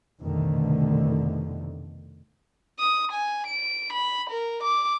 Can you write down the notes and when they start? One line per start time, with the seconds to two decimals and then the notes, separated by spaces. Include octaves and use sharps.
0.22 C2 F2 B2 D3 D#3 A3
2.79 D#6
3.12 G#5
3.47 D7
3.93 B5
4.30 A#4
4.63 D6